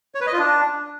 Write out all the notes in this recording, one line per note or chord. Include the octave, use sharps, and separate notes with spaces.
C#5
B4
D#5
F4
D4